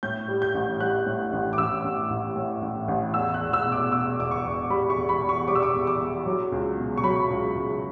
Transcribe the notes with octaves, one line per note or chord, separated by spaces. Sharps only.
A2 G6
G3
G6
A1
G3 F#6
A2
A1
D6
A1 E6
A1
A1
A2
A1
A1
E2 E6
F#6
E1
E6
B2
D6
B2 E6
E1 D6
C#6
E1
G3 B5
C#6
E2
B5
E2
C#6
G3 D6
E6
D6
E2
D6
E2
F#3
C#2
B2
C#6
F#3 B5
C#2
C#2